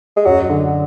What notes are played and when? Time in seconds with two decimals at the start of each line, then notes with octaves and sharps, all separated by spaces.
0.16 G#3
0.25 F#2 F#3
0.49 D3